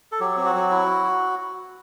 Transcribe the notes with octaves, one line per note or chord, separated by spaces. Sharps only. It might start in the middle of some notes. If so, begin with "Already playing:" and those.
A4
F#3 G4
C4 G4
F#4
F#3
E4